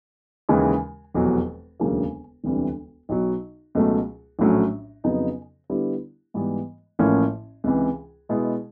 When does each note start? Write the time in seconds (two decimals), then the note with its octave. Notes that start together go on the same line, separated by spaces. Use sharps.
0.49 D#2 C#3 E3 G#3
1.14 F1 E2 B2 F#3
1.80 E1 D2 C#3 F#3 A#3
2.44 E1 D2 C3 E3 G3
3.09 B1 B2 F#3
3.75 C#2 B2 F#3 A3
4.39 A#1 A2 F#3 A3 C#4
5.04 F2 C#3 F#3 B3 D#4
5.70 D3 G3 B3 E4 G4
6.34 G#2 E3 G3 B3
6.99 A1 A2 F3 A#3 C#4
7.64 C#2 C3 E3
8.29 B2 G#3 B3 E4 G#4